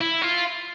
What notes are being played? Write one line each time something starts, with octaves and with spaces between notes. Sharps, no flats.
E4
F4